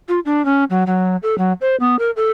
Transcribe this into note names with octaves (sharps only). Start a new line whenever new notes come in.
F4
D4
C#4
F#3
F#3
A4
F#3
C5
B3
A#4
A4